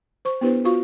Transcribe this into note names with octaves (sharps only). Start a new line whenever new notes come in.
C5 C#6
B3 D4 E4 G4 B4 C5
F4 F#4 F5 C#6